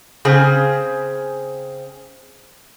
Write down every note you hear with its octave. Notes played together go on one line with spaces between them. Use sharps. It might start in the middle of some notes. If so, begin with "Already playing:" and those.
C#3 C4 G#4